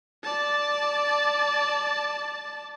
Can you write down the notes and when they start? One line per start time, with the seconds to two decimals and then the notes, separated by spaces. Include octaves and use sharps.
0.23 D5 A5